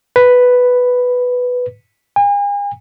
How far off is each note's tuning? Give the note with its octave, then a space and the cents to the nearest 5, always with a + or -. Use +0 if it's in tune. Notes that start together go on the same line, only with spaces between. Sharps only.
B4 +5
G#5 -40